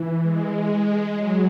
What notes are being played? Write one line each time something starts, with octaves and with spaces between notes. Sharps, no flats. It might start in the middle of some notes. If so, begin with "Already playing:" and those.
Already playing: E3
G#3
G#3
F#3